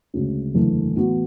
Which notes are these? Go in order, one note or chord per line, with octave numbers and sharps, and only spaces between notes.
D2 C#3 G#3 C#4
F#1 E2 D3 A3
A2 E3 B3 F#4